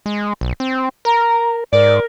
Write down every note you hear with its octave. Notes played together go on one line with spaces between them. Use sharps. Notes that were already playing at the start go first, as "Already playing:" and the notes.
G#3
B1
C4
A#4 A#5
G#2 A#4 D5